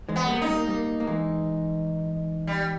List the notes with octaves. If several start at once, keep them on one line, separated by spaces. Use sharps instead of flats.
E3 G#3
B3
G3 A#3
D#4
G3 A#3
G3 A#3
A#3
E3 G#3
G3